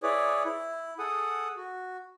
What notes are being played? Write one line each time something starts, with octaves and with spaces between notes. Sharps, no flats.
E4 G#4 B4 C#5 D5
E4
G#4 A4 F#5 D#6
F#4